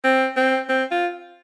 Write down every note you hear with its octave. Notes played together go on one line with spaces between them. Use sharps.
C4
C4
C4
F4